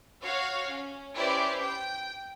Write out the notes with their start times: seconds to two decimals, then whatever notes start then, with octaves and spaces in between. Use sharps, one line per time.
0.24 F#4 C#5 F5
0.70 C#4
1.16 C#4 E4 G4 B4 C5 D5
1.63 G5